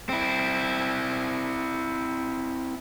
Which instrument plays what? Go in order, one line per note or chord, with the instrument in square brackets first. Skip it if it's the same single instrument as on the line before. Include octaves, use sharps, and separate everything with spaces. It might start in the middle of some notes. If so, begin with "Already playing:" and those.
[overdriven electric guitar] C4 E4